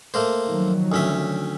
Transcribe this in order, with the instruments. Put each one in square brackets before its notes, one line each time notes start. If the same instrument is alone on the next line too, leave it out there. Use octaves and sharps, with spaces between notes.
[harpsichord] A3 A#3 C5
[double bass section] D#3 F3 F#3
[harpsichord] D2 C#4 E5